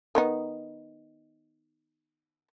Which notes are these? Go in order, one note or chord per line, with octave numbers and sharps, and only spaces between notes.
D#3 B3 D#4